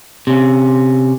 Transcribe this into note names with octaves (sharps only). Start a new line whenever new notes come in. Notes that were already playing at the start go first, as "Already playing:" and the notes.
C3 C#4